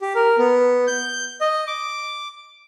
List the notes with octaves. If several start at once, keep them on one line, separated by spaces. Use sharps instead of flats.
G4
A#4
B3
G6
D#5
D6